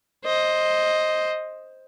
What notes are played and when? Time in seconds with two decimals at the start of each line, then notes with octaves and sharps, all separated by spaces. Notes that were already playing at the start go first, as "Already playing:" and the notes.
0.25 C5 D#5